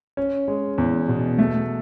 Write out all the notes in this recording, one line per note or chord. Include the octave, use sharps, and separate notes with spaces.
C#4
G#3
E2
B2
A3